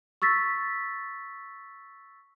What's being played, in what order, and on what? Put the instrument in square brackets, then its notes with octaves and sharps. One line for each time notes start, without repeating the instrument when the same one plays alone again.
[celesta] C#6 E6 A6 B6